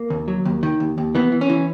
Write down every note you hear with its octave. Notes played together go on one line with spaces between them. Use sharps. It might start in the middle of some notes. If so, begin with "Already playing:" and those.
Already playing: A#3
D#2
F#3
D#2
D#3
D#2
D#2
E3 B3
E3
C#4
E3